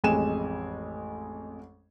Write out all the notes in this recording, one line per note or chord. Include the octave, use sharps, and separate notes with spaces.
A1 F2 G#3 G#5 E7